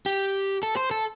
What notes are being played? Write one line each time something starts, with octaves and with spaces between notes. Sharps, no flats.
G4
A4
C5
A4